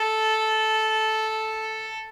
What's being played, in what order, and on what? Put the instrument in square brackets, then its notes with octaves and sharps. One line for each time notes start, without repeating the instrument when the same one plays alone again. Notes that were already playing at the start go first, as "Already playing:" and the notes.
Already playing: [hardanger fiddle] A4